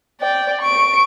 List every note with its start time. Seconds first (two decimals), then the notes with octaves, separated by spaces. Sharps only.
0.21 D5 G5
0.61 C#6 D7